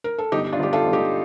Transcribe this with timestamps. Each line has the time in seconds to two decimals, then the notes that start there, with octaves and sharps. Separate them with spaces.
0.04 A#4
0.18 A4
0.32 G1 D#4 G4
0.53 D4 F4
0.59 G1 G4
0.73 F4 A4
0.86 G1
0.93 D#4 G4